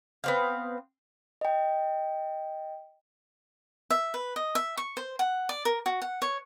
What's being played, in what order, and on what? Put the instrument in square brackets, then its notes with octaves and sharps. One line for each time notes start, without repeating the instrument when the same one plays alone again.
[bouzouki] B3 C4 F5
[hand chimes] D#5 G5
[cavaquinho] E5
B4
D#5
E5
C#6
C5
F#5
D5
A#4
F#4
F#5
C#5